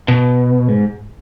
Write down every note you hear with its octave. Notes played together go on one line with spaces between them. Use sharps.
B2
G#2